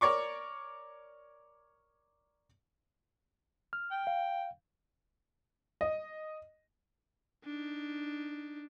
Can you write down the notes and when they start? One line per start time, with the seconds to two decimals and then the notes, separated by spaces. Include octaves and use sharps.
0.01 A#4 C#5 D5 C#6 D6
3.73 F6
3.91 G5
4.07 F5
5.81 D#5
7.44 D4 D#4